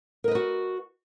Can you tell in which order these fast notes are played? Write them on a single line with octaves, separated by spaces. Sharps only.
A#4 D#5 B4 F#4